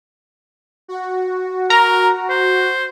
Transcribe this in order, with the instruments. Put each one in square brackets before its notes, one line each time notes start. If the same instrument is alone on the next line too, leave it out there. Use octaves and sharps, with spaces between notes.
[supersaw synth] F#4
[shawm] A#4 [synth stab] A#5
[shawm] C5